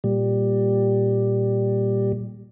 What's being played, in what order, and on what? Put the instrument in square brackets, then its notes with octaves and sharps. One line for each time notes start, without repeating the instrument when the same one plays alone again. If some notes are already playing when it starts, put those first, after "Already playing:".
[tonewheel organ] A#2 G3